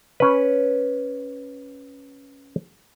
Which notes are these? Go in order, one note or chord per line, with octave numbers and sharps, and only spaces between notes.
C#4 B4